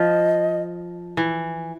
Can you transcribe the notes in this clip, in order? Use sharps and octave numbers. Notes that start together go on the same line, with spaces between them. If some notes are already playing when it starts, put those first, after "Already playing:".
Already playing: F3 D#5
E3